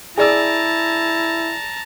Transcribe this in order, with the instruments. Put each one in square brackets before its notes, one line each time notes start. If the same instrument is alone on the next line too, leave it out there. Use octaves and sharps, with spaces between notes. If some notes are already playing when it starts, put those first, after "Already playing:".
[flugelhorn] E4 [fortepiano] G#4 D5 E6 [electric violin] A5 A#5